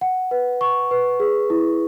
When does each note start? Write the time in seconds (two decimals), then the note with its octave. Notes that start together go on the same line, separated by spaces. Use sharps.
0.01 F#5
0.31 B4
0.61 C#6
0.91 B4
1.20 G#4
1.50 E4